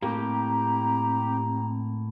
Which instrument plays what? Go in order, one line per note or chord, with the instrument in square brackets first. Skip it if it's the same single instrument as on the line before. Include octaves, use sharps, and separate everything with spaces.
[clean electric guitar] A2 A#3 [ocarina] C4 [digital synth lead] G4 [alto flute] A#5